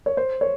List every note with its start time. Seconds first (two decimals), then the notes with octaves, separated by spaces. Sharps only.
0.06 C#5
0.17 C5
0.41 C#5